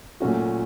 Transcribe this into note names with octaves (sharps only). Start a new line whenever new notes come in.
A#2 F#3 A3 C#4 F#4